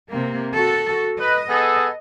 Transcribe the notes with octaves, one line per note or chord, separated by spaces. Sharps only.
C3 A#3
F#4 A4
B4 D#5
B3 G#4 A4